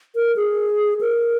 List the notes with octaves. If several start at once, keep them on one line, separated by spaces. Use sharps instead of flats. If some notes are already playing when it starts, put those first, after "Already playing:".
A#4
G#4
A#4